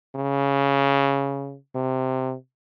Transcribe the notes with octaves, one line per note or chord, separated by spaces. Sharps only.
C#3
C3